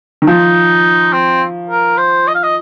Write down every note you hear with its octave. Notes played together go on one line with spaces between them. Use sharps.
D#3
F3 D#4
C4
A#4
C5
D#5
F5
D#5